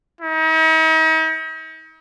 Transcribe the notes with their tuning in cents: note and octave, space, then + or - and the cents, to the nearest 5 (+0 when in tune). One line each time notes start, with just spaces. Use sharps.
D#4 +45